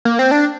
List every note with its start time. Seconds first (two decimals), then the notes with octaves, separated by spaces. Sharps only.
0.05 A#3
0.19 C4
0.31 D4